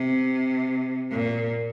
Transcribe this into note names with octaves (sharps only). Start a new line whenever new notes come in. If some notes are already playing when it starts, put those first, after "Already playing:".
Already playing: C3
A#2